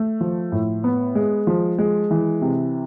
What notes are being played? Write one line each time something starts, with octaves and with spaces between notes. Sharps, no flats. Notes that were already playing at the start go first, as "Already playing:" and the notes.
Already playing: A3
F3
A2
B3
G#3
F3
G#3
E3
C3